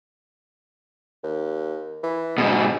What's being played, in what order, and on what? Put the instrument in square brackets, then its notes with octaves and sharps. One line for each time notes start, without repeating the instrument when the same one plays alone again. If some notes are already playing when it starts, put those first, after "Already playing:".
[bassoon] D#2
E3
[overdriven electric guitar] G#2 B2 [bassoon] G#3